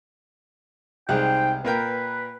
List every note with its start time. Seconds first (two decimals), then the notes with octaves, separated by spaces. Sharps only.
1.09 C2 G#3 D#4 C5 G5 F#6
1.65 A#2 A#4 B4 G5